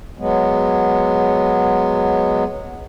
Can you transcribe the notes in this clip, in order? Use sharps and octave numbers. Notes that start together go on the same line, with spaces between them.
F#3 G#3 B3